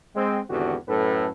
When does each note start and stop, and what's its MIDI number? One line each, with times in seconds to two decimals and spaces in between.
0.15 0.39 56
0.15 0.39 60
0.49 0.75 32
0.49 0.75 40
0.49 0.75 50
0.49 0.75 66
0.49 0.75 67
0.88 1.28 42
0.88 1.28 45
0.88 1.28 69
0.88 1.28 71